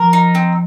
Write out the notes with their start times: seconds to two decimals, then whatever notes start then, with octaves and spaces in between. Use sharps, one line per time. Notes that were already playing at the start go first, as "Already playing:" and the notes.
Already playing: F3 A#4
0.13 D#4
0.35 C4